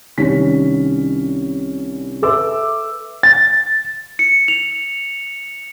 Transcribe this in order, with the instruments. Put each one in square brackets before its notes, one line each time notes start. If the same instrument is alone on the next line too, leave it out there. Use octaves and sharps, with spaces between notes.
[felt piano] C2 D#3 G3 C#4 B6
A4 B4 E5 D6 E6
[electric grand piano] A6
[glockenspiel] C#7
F7